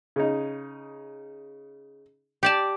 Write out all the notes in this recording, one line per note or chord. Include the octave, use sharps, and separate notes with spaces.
C#3 D#4
G4 D5 A5